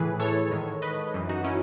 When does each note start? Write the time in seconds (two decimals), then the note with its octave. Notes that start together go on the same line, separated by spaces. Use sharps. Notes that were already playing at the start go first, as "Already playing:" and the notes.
Already playing: A2 E3 G#4 B4
0.20 A4 C#5
0.51 G#2 D#3
0.82 B4 D#5
1.14 F#2 E3
1.29 D#4 F#4
1.44 C#4 E4